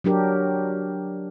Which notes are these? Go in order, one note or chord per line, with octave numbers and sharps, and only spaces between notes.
F#3 D4 G4 A#4